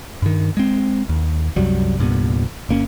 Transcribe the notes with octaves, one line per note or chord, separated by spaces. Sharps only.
G2 D#3
G#3 C4
D#2
C2 F#2 F#3 G3
C2 G2 A#2 B3
G1 A#3 C#4